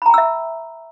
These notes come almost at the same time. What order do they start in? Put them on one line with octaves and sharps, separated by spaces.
B5 A#5 G5 E6 E5